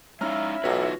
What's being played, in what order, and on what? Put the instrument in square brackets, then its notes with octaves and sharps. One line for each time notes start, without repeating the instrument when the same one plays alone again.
[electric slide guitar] G#3 D#4 F5 [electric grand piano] C#4 A#5 F6 [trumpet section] E4 E5
[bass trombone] B1 [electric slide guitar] D#4 F4 B4 [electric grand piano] F#4 C#5